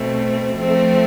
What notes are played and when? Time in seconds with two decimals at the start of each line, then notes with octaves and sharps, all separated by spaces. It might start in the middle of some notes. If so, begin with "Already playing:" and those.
Already playing: B2 A3 C4
0.56 F3 A3 C4